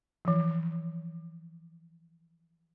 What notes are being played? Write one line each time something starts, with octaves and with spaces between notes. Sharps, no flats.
E3 F3